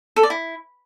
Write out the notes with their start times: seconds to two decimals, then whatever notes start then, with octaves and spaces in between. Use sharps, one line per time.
0.16 A4
0.23 D5
0.30 E4